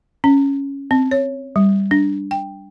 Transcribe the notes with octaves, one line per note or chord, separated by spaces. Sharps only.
C#4
C4
C#5
G3
D4
G5